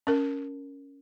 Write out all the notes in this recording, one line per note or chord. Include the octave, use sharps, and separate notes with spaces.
C#4 A#4